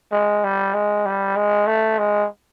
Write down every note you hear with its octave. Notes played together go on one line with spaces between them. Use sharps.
G#3
G3
G#3
G3
G#3
A3
G#3